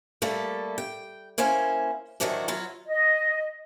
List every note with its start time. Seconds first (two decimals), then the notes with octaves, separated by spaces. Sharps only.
0.22 G3 A3 A#3 A4
0.78 G5
1.38 A#3 C#4 E4 C5 G#5
2.20 D#3 E3 F#3 A3 C4 D4
2.48 F#3 E4 F4
2.88 D#5